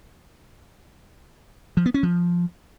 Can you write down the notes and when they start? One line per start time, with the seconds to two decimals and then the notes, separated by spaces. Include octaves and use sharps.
1.77 F3
1.86 B3
1.94 C#4
2.03 F3